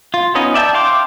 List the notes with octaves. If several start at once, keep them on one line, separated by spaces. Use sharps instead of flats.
F4
B3 C#4 D#4 D#5
D5 E5 G5 A5
F5 G5 C6 D6